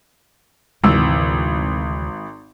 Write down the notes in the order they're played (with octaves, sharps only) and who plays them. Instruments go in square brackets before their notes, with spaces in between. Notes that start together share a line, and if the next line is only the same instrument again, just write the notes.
[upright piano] G#1 E6 [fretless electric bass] D2 C3 E3